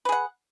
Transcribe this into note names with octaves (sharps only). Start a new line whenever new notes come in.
G#4 B4 F#5